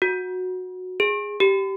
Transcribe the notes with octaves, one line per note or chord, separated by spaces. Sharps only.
F#4
G#4
G4